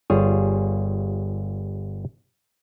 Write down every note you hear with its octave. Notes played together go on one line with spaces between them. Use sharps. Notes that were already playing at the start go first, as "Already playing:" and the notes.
G1 G3 F4 G#4 C#5 G#5